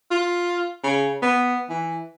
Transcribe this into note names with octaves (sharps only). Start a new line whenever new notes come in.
F4
C#3
B3
E3